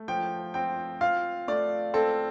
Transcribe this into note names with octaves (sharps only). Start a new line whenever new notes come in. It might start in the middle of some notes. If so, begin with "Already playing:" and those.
Already playing: A3
F3 G5
C4 G5
F4 F5
A3 D5
C4 A4